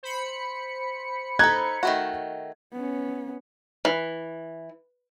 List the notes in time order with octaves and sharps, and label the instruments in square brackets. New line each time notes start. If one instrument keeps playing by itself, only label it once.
[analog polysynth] C5 B5 C#7
[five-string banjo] D#4 A4 [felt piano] A#5 F#6 G#6
[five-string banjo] D#3 A3 F#4
[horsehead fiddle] B3 C#4
[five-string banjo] E3